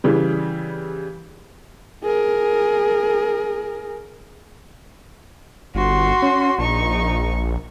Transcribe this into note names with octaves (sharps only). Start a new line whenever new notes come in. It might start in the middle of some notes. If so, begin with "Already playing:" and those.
C#3 E3 G3
G#4 A#4
G1 F#4 C6
C#4
A#1 D#4 C#6